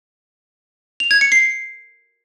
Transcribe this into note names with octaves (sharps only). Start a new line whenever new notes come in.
F7
G#6
C#7
C7